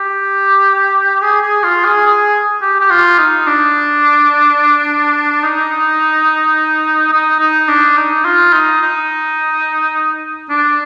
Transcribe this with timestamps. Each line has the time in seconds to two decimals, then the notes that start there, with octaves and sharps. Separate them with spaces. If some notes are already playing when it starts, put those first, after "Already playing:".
Already playing: G4
1.22 G#4
1.42 G#4
1.63 F4
1.84 G#4
2.06 G#4
2.62 G4
2.80 G4
2.91 F4
3.19 D#4
3.47 D4
5.43 D#4
7.13 D#4
7.40 D#4
7.68 D4
7.97 D#4
8.25 F4
8.53 D#4
8.81 D#4
10.50 D4